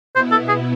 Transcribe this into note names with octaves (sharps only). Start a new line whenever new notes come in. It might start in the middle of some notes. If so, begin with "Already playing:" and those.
B2 B3 E4 C5
A4
G#4